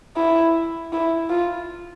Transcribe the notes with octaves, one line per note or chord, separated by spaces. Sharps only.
E4
E4
F4